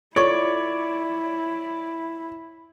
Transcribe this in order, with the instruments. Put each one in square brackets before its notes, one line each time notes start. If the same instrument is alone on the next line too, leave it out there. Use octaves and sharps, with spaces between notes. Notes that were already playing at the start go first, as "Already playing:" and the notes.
[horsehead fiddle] E4 [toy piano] F4 A4 C#6 [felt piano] C#5 [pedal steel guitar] D5